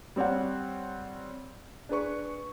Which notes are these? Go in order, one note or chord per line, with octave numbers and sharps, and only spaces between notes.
G3 C4 C#5 D5 F#5
D4 G#4 B4 C#6